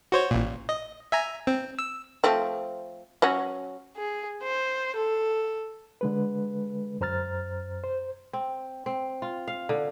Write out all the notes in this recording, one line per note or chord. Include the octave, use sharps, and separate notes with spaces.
F#4 C5 C#5
A1 A#2
D#5
E5 G#5 A#5
C4
E6
F3 A3 C4
F#3 C#4 F#4
G#4
C5
A4
D3 G#3 B4
F#2 C5 A#5 F6 A6
C5
C4
C4
F4
F5
D3